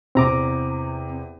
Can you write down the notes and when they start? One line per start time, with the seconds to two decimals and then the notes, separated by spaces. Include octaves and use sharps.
0.15 E2 C3 C4 A#5 D6